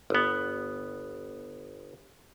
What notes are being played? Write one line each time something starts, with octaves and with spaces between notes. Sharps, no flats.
G1 B3